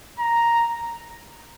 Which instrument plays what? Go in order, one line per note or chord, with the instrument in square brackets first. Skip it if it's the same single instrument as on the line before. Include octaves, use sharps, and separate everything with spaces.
[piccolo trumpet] A#5